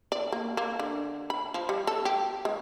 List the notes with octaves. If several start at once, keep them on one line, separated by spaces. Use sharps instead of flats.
D5
A#3
A#3
D3
B5
F3
G3
A4
G4
G#3